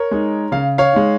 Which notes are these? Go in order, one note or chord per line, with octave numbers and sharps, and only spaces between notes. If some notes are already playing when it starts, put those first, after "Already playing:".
Already playing: A#4 C#5
G#3 D#4
C#3 F5
C#5 F5
G#3 D#4